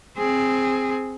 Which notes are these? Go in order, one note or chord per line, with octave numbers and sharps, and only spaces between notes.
C4 G#4